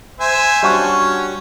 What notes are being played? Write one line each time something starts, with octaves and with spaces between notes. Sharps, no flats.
C5 E5 G#5
G3 C#4 D4 F#4